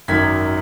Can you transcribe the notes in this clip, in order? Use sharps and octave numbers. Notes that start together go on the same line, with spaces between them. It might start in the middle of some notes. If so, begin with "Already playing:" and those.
G#1 F#2 D#3 F#3 G#6 B6